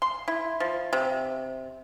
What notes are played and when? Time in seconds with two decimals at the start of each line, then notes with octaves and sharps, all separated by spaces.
0.02 C6
0.28 E4
0.60 F3
0.93 C3